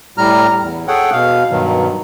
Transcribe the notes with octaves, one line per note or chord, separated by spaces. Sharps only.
A2 G3 A#5 F6
E2
G#4 A4 C#5 F#5 G5
B2 F5
G2 B2 D#3 F#3